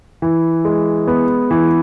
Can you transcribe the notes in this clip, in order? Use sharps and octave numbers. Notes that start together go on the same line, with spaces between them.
E3
G#3
B3
E3